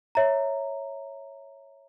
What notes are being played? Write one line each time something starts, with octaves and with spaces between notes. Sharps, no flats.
C#5 E5 A#5